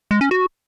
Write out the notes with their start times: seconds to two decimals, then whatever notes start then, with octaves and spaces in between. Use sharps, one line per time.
0.11 G#3
0.21 C#4
0.31 F#4